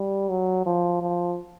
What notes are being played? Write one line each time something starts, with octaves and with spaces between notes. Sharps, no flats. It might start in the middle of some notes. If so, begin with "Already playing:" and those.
Already playing: G3
F#3
F3
F3